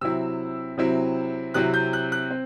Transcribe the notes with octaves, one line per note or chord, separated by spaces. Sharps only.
C3 F#3 C4 E4 E6
C3 F#3 C4 E4
C3 F#3 C4 E4 F#6
G6
F#6
F#6
C4